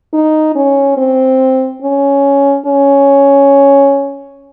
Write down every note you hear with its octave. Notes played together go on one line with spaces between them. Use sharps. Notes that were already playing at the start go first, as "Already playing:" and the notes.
D#4
C#4
C4
C#4
C#4